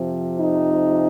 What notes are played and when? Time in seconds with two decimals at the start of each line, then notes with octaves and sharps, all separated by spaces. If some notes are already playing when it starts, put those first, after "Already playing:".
Already playing: F2 C3 F3
0.37 D#4